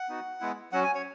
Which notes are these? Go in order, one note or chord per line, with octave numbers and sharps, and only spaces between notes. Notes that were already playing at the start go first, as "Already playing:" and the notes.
Already playing: F#5
B3 D#4 F#4
G#3 B3 E4
F#3 C#4 F#4 F#5
G#5
C#5